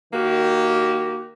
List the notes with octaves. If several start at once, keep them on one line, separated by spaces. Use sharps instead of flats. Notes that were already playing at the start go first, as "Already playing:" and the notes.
D#3 A#3 F#4 G4